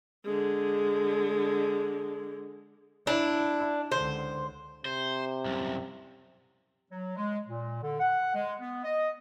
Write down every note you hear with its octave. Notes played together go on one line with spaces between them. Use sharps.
D3 G#3
D4 E4
C#2 D3 C5
C3 C5
C2 F#2
F#3
G#3
A#2
D3
F#5
G#3
B3
D#5